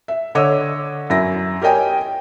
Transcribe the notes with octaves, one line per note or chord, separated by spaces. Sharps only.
E5
D3 C#5 D#5 D6 E6
F#2 E4 A#6
G4 A#4 C#5 D#5 G5 G#5